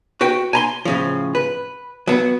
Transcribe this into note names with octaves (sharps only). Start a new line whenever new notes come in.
F#4 B4 G5
G#5 A#5 C6
A2 C#3 F3
B4
F#3 B3